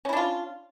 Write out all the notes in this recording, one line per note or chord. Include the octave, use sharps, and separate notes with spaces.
C#4 D4 E4 F4